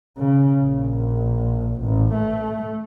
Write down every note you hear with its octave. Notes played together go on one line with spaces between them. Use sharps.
C#3
A#1
A1
A3